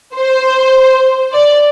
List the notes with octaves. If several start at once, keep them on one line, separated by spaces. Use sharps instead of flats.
C5
D5